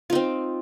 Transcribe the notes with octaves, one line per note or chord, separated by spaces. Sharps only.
C4 D#4 F4